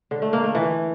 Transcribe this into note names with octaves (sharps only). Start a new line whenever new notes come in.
D3
A3
A#3
A3
E3